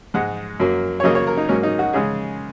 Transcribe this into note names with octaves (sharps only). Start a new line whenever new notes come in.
G#2 G#3 F#5
F#2 F#3 A#3
C#5
C#3 F#3 A#3 D#5
C#5
A#4
D#4
G#2 F#3 A#3 C#4
D#4
F#4
C#3 G#3 G#4